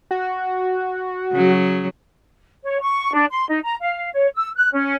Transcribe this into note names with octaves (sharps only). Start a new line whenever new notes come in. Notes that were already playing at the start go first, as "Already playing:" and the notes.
F#4
C#3 F#3
C#5
C#6
D4
C6
D#4
A#5
F5
C#5
E6
F#6
C#4